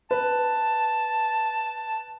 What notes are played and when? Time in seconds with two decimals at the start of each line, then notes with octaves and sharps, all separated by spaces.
0.11 B4 A5